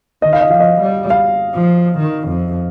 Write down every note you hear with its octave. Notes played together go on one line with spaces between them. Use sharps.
D#3 D#5
F5
D#5
F3 F5
D#5
G3
F5
F3
D#3
F2